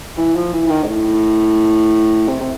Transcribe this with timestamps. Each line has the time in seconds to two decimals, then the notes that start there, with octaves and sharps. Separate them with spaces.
0.18 E3
0.36 F3
0.53 E3
0.66 E3
0.70 D#3
0.83 G#2
0.88 A2
2.28 C3
2.40 C3